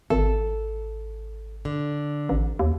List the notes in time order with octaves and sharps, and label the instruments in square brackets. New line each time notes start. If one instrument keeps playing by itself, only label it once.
[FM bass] G#1 [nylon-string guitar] A4
[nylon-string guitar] D3
[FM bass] A1
D#2